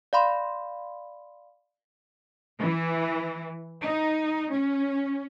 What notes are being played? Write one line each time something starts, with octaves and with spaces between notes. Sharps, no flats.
D5 F5 B5 C6
E3
D#4
C#4